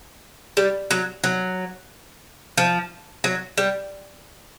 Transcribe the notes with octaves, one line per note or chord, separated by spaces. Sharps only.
G3
F#3
F#3
F3
F#3
G3